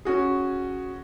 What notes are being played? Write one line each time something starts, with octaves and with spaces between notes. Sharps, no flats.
C#4 F#4 G#4